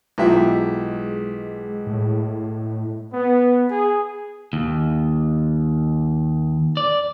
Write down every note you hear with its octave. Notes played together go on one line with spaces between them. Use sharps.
B1 G#3 E4 F4 G4 E5
A2
B3
G#4
D#2
D5